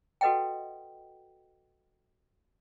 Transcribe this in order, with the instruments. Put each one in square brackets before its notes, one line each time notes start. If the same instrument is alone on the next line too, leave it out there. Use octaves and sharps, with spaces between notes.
[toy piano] F#4 A4 B4 D#5 F#5 G5